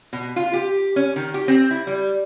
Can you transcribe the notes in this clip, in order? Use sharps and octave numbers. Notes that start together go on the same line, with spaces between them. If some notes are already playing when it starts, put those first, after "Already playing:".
B2
F4
G4
C#4
D#3
G4
C4
E4
G3